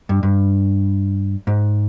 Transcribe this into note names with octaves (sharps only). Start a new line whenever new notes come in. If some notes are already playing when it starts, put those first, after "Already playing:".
G2
G2
G#2